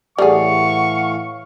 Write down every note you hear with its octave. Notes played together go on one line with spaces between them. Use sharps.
A2 E3 G3 A3 G#4 F5 F#5 C#6